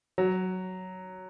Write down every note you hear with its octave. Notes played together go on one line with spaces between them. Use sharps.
F#3